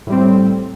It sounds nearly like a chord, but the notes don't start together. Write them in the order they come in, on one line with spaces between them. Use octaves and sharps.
A2 G3 C4